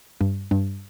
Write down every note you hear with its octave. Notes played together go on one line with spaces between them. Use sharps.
G2
G2